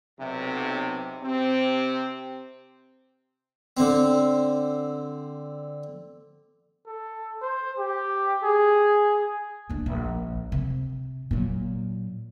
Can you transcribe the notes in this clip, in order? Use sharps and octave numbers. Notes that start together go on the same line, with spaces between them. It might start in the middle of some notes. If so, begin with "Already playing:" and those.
B1 C3
C3 C4
D3 C4
A4
C5
G4
G#4
D1 D4
A#1
C3
A#2 F#3